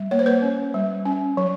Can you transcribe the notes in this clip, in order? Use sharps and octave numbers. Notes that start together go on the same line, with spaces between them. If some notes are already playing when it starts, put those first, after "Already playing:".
Already playing: G3
A#3 C#5
C5
B4 C#5
C#4
G3
C#4
F#3